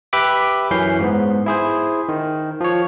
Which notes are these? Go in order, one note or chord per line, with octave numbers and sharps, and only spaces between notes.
G4 B4 E5 B5 D6
F#2 E3 C#4 G6 C7
G#2 B3
E4 G#4 C5
D#3
F3 C#5